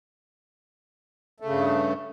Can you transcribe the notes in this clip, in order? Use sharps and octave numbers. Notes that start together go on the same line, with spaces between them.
G2 C#3 A3